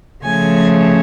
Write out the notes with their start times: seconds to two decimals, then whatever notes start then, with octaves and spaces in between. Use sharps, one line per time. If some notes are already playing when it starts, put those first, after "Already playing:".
0.24 C#3 F3 A3 C#4 G#5